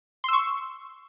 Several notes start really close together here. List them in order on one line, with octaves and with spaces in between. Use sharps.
C6 E6 C#6